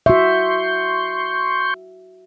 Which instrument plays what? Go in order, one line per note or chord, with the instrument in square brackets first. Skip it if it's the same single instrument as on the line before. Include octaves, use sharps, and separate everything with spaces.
[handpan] F#4 E5 [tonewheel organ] C6 C#6 G6